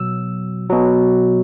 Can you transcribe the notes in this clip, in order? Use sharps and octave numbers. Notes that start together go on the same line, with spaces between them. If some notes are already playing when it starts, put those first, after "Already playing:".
Already playing: B2 F#3 E6
B2 F#3